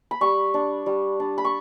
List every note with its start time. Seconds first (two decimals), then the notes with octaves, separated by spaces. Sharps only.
0.11 B5
0.21 G3 C#6
0.54 D4
0.86 G3
1.20 D4
1.38 B5
1.45 C#6